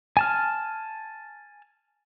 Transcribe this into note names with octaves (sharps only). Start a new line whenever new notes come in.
G#5 A5 F6